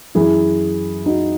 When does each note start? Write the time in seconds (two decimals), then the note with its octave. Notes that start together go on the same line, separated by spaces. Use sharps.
0.15 F#2 E3 E4 G#4
1.06 D#4 F#4